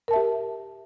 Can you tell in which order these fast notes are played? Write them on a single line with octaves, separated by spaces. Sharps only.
A#4 A5 E5 G4